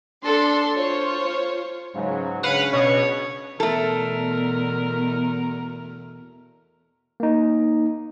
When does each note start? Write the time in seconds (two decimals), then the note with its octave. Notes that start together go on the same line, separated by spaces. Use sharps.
0.24 D4 A4 C6
0.76 F4 C5 C#5
1.95 C#2 G#2 C#3 F#3
2.43 C#3 C#4 D4 B4 F5 F#5
2.73 B2 C#5
3.60 E2 B2 A3 A4 A#4
7.20 A#3 D#4